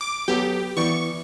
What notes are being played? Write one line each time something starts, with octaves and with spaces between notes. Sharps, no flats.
D6
F#3 B3 G4 A4
E3 B3 D5 C#6